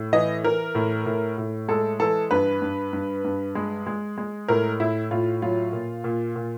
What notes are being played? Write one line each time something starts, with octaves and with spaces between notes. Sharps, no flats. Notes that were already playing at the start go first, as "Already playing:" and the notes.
Already playing: A2
E3 D#5
E3 A#4
A2
A2
A2
G#3 A4
E3 A4
G2 B4
G2
G2
G2
G#3
G#3
G#3
A2 A#4
A2 E4
A2 F4
F#3 F4
A#2
A#2
A#2